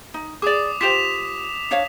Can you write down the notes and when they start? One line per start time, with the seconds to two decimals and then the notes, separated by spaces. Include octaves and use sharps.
0.14 D#4
0.42 G#4 D5 D6 D#6
0.81 F4 G4 C5 B6 E7 F7
1.71 D4 C#5 F5